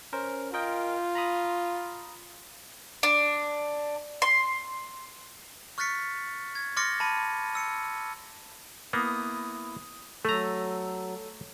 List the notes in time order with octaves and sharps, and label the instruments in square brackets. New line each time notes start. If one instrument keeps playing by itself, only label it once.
[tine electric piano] C#4 A#4 C5
[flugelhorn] F4 [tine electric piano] A#4 D#5 G5
[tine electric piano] A#5 B5 D#6
[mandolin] D4
C6
[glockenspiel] C#6 F6 F#6 A6 B6 C#7
G#6
C6 D6 F6 A6 A#6 C#7
A5 B5 D#7
E6 C#7
[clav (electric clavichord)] A#3 B3 [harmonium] E4 [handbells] D#6
[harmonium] F#3 [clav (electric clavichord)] A3 A#5 [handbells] A4